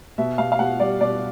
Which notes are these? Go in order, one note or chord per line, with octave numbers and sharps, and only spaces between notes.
B2 E5
B2 F5
F5
B2 F#5
G3 D5
B2 D5